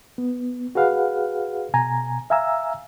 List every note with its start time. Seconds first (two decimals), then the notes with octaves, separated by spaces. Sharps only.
0.18 B3
0.75 F#4 G#4 B4 F5 F#5
1.74 B2 G#5 A#5
2.30 E5 F5 G#5 A#5 E6